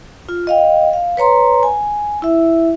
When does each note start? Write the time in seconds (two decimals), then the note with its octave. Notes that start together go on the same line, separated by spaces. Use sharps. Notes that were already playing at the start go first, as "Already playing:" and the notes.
0.29 F4
0.47 D#5 F5 G5
0.93 F5
1.17 B4 C#5 A#5 C6
1.63 G#5
2.22 E4 E5